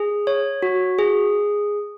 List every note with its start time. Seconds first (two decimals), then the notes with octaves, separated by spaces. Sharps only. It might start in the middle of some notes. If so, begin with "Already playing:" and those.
Already playing: G#4
0.27 C#5
0.62 F#4
0.99 G#4